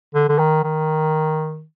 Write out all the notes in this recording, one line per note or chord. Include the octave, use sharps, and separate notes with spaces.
D3
D3
D#3
D#3